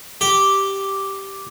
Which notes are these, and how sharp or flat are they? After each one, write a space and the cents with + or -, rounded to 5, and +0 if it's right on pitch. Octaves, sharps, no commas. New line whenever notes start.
G4 -5